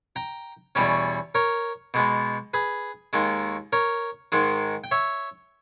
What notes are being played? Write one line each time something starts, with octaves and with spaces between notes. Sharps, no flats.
G5 A#5
E2 B2 G3 C#4
A#4 C#5
B2 G#3 B3
G#4 B4
D#2 D#3 G#3
A#4 C#5
G#2 D#3 G#3
G5
C#5 E5